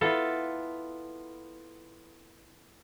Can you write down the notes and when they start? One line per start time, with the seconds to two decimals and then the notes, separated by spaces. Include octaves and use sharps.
0.01 B3 E4 F4 A4